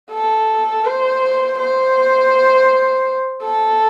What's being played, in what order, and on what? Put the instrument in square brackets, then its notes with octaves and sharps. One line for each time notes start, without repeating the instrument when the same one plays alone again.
[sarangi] A4
C5
C5
A4